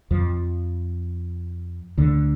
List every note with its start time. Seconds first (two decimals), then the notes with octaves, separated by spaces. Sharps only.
0.11 F2 F3
1.98 D2 D3